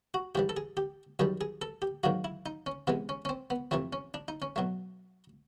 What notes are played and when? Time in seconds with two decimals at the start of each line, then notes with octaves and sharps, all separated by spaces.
0.14 F#4
0.35 G#2 E3 G3 G4
0.49 A4
0.57 G#4
0.77 G4
1.19 F#2 D#3 G3 G#4
1.41 G#4
1.62 A4
1.82 G4
2.04 G#2 D#3 F#3 A#3 F#4
2.24 E4
2.46 D#4
2.66 C#4
2.87 C3 E3 G#3 B3
3.09 C#4
3.25 C#4
3.29 C4
3.50 B3
3.71 F2 C3 E3 A3 C4
3.93 C#4
4.14 D4
4.28 D#4
4.42 C#4
4.56 B2 F#3 A3